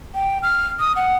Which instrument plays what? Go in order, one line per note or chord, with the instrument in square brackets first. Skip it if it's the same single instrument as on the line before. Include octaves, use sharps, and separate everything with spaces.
[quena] G5
F6
D#6
F#5